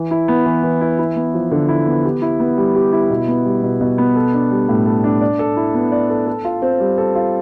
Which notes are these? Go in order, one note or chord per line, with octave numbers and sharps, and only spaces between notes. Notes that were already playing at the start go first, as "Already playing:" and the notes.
Already playing: E3
E4
B3
E3
E3
E4
E4
B3
F3
D3
E4
B3
G4
E4
B3
G3
G4
E4
B2
B3
G3
B2
B2
B3
A4
D4
G3
A2
A4
D4
D5
A4
E4
B3
D5
A4
A4
F4
C4
G3
A4
F4